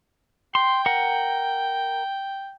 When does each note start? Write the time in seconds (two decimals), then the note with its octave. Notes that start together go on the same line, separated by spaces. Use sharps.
0.55 G5 C6
0.86 A#4 F#5